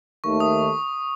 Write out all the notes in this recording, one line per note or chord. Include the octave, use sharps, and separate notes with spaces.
D#2 D#3 A3 C#6
D#6